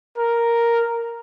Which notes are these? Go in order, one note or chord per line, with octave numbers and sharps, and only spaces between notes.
A#4